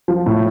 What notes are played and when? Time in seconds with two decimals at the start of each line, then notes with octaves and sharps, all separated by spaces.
0.08 F3
0.26 A2